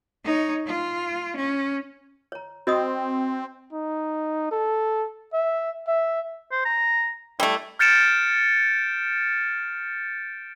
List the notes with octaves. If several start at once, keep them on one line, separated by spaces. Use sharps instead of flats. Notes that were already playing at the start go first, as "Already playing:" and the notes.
D#4 C#5
F4
C#4
C#5 A#5
C4 F#4 D#5 D#6
D#4
A4
E5
E5
C5
A#5
G3 A3 E4
F6 G6 A6 C#7 D7 E7